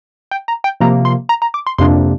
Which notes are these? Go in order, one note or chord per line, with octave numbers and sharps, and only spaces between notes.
G5
A#5
G5
C3 F3 A#3 A#5
C6
A#5
A#5
D6
C6
F2 C3 A#3 D4 C6